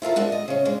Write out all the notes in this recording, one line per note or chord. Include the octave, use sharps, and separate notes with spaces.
E4 F4 A4 A#4
G#3 D4 F#5
D#5
C#3 C#4
G#3 D4